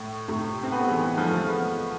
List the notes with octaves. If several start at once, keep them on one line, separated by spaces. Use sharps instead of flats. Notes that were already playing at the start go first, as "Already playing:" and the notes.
Already playing: A2
A2 C3
C4
B3
A3
E3 G#3
F3 A3
F3 A3
G#3 B3